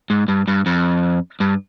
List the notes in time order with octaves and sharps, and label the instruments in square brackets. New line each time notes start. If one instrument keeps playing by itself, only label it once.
[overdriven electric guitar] G#2
G2
G2
F2
G2